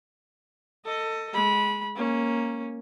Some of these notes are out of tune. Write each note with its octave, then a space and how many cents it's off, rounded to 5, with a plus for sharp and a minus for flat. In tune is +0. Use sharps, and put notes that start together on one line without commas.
A4 +20 D#5 +5
G#3 +0 B5 -20
A#3 +0 C#4 -5